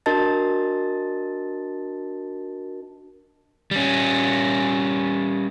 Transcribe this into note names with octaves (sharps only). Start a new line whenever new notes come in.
D4 F#4 A#4 D#5 A5 A6
G3 C#4